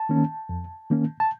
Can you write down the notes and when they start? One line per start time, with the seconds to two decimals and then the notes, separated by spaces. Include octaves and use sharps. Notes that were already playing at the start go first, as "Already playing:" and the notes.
Already playing: A5
0.09 D#3 A#3 C#4
0.49 F2
0.90 D#3 A#3 C#4
1.20 A5